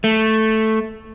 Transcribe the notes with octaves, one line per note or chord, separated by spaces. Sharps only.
A3